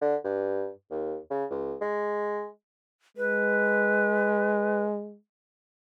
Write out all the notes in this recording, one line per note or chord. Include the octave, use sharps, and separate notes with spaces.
D3
G2
D#2
C#3
C#2
G#3
G#3 B4